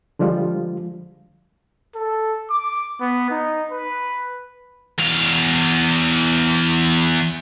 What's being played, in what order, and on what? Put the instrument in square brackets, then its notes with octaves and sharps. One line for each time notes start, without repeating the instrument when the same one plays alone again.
[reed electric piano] D3 F3 G3 G#3 F4
[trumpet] A4
D6
B3
D#4
B4
[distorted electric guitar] E2 F5